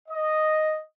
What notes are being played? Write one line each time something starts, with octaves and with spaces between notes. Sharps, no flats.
D#5